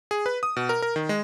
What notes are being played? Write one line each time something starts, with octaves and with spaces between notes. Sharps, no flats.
G#4
B4
D#6
B2
A#4
A#4
D#3
G#3